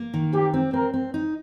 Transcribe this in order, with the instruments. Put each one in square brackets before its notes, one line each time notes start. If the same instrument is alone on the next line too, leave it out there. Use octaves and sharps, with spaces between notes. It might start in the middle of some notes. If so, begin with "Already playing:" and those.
Already playing: [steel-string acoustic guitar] A#3
D#3
[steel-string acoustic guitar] C4 [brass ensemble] G4
[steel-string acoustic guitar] C4
[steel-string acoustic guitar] C4 [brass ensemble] A#4
[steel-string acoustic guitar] C4
D#4